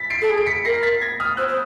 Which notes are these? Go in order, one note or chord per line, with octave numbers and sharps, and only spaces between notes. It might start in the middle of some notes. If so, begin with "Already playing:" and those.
Already playing: A6 B6
C7 D7
A4
G#4
D7
B6 C#7
A#4 A#6 C7
A6 B6
G#6 A#6
D#6 F6
C5 E6 F#6
C5